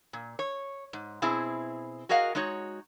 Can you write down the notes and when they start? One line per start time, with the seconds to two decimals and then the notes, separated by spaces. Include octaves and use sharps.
0.13 A#2
0.39 C#5
0.93 G#2
1.22 B2 C4 E4 G#4
2.09 F#4 G#4 A#4 D#5 F5 F#5
2.35 G#3 D#4 F#4 C#5